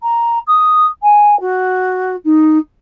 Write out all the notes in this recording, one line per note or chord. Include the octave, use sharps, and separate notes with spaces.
A#5
D#6
G#5
F#4
D#4